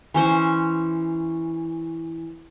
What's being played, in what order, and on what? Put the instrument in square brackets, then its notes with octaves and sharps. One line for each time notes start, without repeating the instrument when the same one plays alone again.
[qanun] E3 C#4 C5